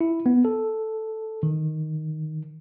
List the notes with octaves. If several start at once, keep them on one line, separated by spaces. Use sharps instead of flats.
E4
B3
A4
D#3